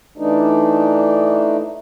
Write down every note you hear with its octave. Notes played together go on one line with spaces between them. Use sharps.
E3 A3 D4 D#4